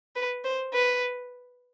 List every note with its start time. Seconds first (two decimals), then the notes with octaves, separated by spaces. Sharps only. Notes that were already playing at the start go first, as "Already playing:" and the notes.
0.16 B4
0.44 C5
0.73 B4